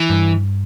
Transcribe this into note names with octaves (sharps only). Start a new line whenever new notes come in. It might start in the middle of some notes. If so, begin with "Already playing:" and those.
Already playing: E3
G2